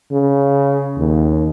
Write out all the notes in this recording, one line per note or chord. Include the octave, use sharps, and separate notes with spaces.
C#3
D#2